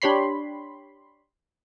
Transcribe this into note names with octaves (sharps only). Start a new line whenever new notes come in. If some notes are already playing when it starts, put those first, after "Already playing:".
D4 G4 C#5 B5 C6